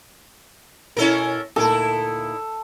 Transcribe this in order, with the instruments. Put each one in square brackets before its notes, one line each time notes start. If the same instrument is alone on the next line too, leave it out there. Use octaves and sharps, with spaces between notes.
[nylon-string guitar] B2 E4 [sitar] C#4 A4 A#4
[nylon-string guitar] D2 A#2 A#4 [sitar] D#4 E4 [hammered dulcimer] A4